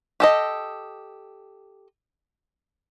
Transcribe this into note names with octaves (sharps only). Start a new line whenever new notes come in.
G4 A4 D#5